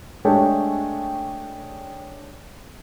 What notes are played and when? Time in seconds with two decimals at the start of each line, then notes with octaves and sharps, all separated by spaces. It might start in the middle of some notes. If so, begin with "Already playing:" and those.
0.25 G#3 A3 D4 G4 C#5 G5